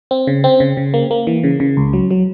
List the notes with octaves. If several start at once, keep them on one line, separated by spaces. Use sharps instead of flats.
C4
C#3
C4
C#3
C#3
A#3
A#3
E3
C#3
C#3
C#2
F#3
F#3